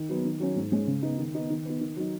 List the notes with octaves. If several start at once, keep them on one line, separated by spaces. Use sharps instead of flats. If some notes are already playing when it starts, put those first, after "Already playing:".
Already playing: D#3
F#3 B3
D#3
F#3 C#4
G#2
G#3 C#4
C#3
B3 D#4
D#3
B3 D#4
D#3
B3 D#4
D#3
F#3 D#4